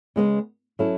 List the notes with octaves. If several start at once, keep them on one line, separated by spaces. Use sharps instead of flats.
C#3 G#3 B3
F#3 C#4 E4 A4